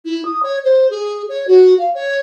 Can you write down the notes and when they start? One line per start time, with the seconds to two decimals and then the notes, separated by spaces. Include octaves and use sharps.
0.05 E4
0.25 D#6
0.43 C#5
0.64 C5
0.90 G#4
1.29 C#5
1.48 F#4
1.79 F5
1.95 C#5